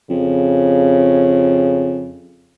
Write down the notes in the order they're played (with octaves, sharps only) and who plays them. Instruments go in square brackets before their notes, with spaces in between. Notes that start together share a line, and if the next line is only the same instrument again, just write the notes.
[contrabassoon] F2 [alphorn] C#3